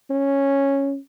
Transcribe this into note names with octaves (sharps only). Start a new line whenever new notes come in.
C#4